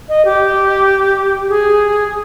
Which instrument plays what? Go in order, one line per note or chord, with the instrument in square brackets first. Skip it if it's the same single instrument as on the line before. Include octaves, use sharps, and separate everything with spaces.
[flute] D#5
G4
G#4